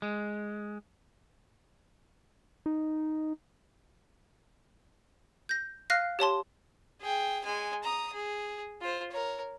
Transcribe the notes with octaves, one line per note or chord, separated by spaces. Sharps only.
G#3
D#4
G6 A#6
F5 F6 F#6 A#6 C7
G4 C#5 A5 C6
G#4 G5
G#3 G#5
A#5 D#6
G#4
F4 C5
A#4 C#5